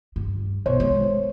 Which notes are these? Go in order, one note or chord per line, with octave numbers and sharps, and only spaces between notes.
G2
B1 C5 C#5
G#3